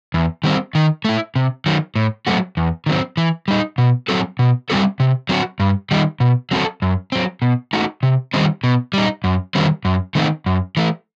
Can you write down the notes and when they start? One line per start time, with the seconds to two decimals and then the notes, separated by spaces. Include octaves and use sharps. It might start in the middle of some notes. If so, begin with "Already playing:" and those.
0.14 E2
0.44 D#3 G3 C4
0.75 D#3
1.05 A3 E4
1.36 C3
1.66 D#3 F#3
1.96 A2
2.27 F#3 A3 C4 F#4
2.57 E2
2.86 D#3 F#3 C4
3.17 E3
3.48 G3 D#4
3.78 B2
4.09 F#3 C4 F#4 A4
4.39 B2
4.70 G3 C4 F#4 A4
5.00 C3
5.29 F#3 C4 F#4
5.60 G2
5.91 D#3 G3 D#4
6.20 B2
6.51 F#3 C4 F#4 A4
6.82 F#2
7.12 F#3 C4
7.42 B2
7.73 A3 D#4 F#4
8.03 C3
8.34 D#3 G3 C4 D#4
8.64 B2
8.93 G3 D#4
9.24 F#2
9.55 D#3 G3 C4 F#4
9.85 F#2
10.15 D#3 A3 C4 D#4
10.46 F#2
10.77 E3 A3